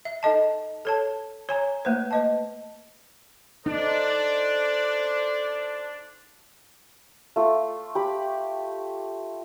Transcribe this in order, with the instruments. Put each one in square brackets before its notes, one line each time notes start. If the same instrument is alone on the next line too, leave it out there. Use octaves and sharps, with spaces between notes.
[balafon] E5
D#4 A4 D#5 A5
A4 C#5 A5
C#5 G#5 A#5
A3 A#3 B4 C5
B4 D#5 A5
[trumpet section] D4 [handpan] D#4 [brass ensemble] A4 C5 D5
[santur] A3 F4
G4 B5